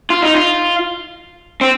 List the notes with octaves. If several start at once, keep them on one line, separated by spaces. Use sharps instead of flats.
F4
D#4
F4
C4